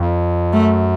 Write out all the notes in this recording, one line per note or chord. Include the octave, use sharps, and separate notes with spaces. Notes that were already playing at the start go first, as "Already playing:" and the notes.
Already playing: F2
F#2 A3